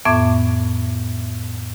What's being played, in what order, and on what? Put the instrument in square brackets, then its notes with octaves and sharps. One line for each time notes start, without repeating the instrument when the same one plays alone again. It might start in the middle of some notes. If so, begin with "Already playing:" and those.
[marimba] F2 A2 B3 E5 D6 G#6